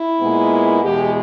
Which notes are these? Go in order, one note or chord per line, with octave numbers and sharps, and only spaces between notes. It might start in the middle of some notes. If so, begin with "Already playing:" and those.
Already playing: E4
A#2 G#3 B3
E2 B2 G#3 G4